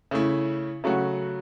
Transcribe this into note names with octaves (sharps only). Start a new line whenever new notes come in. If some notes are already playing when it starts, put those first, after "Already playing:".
C#3 A3 E4
C#3 F#3 A3 F#4